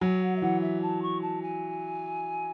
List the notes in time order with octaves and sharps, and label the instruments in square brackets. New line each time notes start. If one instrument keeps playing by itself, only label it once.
[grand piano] F#3 [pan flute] G#5
[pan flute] F#5
E5
[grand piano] E3 [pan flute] F#5
[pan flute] E5
A5
C#6
A5
G#5